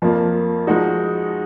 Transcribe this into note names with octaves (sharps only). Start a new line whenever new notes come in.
F2 F3 A#3 F4
F3 G#3 D#4 F#4